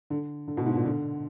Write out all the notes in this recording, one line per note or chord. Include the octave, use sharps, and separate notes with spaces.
D3
D3
B2
G#2
A#2
D3